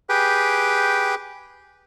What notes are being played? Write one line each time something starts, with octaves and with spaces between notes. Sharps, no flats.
G4 G#4 B4 G5